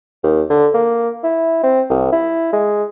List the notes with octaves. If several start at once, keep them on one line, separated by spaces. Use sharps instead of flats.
D#2
D3
A#3
E4
C4
C2
E4
G#3